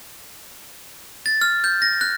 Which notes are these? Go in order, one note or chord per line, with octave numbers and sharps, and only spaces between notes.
A6
F6
G6
A#6
F#6